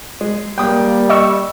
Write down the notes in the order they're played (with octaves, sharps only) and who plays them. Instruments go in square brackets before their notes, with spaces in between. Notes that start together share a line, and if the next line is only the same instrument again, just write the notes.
[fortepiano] G#3
[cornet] G3 [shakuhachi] A#3 [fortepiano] G5 D#6
[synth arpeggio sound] D#5 C#6 E6